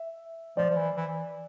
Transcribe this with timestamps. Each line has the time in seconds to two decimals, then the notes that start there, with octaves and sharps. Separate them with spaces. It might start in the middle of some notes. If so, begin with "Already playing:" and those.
Already playing: E5
0.57 F3 D5
0.71 F3
0.76 E3
0.96 E3